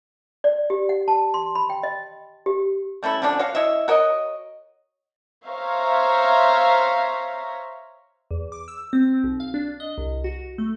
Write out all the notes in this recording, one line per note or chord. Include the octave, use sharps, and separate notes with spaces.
D5
G4
F#5
A5
C6
B5
G5
D#5
G4
G3 A3 C#4 E4
D3 F3 C#4 D4
F#4 C#5 F5
E4 C#5 D#5 E5
F#4 A#4 C#5 D#5
C5 C#5 E5 F5 A#5
E2
D6
E6
C4
B1
F5
D4
D#5
C2
F#4
A3